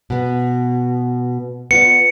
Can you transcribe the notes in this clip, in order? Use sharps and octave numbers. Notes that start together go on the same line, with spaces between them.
B2 B3
B3 F4 D5 C#7